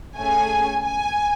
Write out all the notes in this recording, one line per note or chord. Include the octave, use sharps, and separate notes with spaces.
A3 C#4 G#4 G#5
G#5